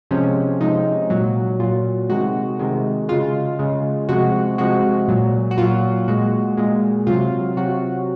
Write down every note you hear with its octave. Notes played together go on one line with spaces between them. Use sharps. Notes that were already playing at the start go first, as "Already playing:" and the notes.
C3 F3 G#3 C#4
C3 F3 G#3 D#4
A#2 F#3
A#2 F#3 F4
C3 D#3 G#3 F#4
C3 D#3 G#3
C#3 G#3 F4
C#3 G#3
C3 F3 G#3 F#4
C3 F3 G#3 F#4
A#2 F#3
F#4
A#2 F#3 F4
A#2 G#3 F#4
A#2 G#3
C3 F#3 F4
C3 F#3 F#4